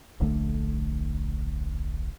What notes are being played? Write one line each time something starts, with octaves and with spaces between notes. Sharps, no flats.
D1 A#1 D3 A3